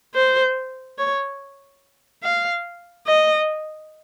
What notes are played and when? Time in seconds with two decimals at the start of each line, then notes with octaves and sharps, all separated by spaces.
0.14 C5
0.98 C#5
2.23 F5
3.07 D#5